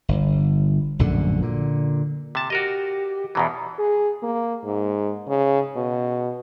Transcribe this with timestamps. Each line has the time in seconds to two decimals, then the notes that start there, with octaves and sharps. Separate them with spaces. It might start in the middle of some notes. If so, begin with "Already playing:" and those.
0.09 G1
0.99 A#1 F#2 A2 D3
1.42 A#2 D3
2.35 C3 A5
2.50 F#4 G4 A#4 D#5
3.35 E2 B2 E3 A#5
3.78 G#4
4.23 A#3
4.64 G#2
5.28 C#3
5.76 B2